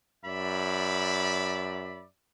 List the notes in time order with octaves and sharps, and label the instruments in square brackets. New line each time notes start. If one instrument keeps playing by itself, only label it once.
[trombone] F#2 [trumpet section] D5 E5 B5